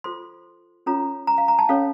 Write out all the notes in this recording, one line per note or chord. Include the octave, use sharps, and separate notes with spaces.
F4 A4 C5 C6
C#4 F4 A4 C#5 A#5
A#5
F5
A#5
A5
C#4 A4 C#5 F5